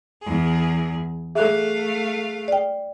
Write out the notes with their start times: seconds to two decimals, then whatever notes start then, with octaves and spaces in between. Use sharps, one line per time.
0.22 E2 G#4
1.35 A3 G#4 A4 E5 F5 F#6
2.48 D5 G5